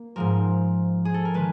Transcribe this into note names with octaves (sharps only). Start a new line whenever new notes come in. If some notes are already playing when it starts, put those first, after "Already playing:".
Already playing: A#3
G#2 F3 G#3 C4 A#4
G#4
A4
A#4
D#3 G#3 B4